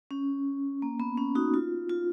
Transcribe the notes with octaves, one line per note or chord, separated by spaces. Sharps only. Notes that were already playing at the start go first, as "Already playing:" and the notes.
C#4
A#3
B3
C#4
D#4 F#4
F4
F4